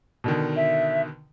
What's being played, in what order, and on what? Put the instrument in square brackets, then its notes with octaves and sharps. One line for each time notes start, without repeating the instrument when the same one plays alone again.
[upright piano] B2 D3 D#3
[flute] E5